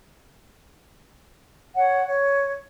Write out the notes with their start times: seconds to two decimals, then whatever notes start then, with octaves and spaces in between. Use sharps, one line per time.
1.75 C#5 F#5
2.08 C#5